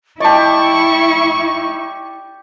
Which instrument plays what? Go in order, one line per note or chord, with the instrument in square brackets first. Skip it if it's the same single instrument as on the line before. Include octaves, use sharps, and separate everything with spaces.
[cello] E4 [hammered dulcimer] G4 D5 [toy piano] D#5 A5 [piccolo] C#6